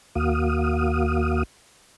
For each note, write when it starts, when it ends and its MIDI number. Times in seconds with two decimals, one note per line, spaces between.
0.15 1.43 39
0.15 1.43 58
0.15 1.43 66
0.15 1.43 77
0.15 1.43 87